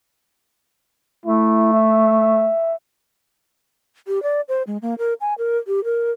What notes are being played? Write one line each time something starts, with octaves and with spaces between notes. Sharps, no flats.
A3 E4
E5
G4
D5
C5
G#3
A#3
A#4
G#5
A#4
G4
A#4